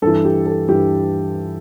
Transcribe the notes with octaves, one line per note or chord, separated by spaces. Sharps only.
G2 E3 A4
G4
A4
G2 E3 G4